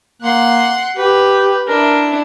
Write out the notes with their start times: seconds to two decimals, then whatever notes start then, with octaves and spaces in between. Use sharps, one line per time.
0.22 A#3 F#5 C6
0.97 G4 B4
1.67 D4 E4 A#4